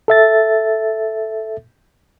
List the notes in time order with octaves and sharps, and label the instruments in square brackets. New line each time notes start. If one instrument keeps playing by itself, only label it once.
[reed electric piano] A4 E5 A6